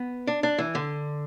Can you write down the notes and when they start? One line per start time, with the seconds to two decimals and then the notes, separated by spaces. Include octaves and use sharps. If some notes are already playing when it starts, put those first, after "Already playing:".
Already playing: B3
0.27 D4
0.43 D4
0.58 E3
0.75 D3